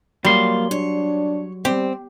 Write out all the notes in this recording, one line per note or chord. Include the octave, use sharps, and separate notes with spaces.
F#3 G3 A#3 F4 C6
D4 C#5
G3 C4 G4